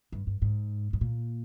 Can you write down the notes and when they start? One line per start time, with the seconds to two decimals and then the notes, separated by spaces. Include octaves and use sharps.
0.12 G2
0.27 G2
0.42 G#2
0.93 G#2
1.01 A#2